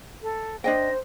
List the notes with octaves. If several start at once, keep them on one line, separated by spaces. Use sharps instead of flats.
A4
D4 C5 D#5 G5 A#6